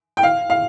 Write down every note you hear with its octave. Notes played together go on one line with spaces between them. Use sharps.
G5
F5
F5